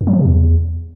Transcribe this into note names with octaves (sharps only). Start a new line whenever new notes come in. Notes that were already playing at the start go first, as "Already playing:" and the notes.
F#2
F#3
F3
C3
E2